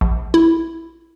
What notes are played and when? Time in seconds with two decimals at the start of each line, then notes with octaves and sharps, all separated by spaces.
0.01 A#1
0.34 E4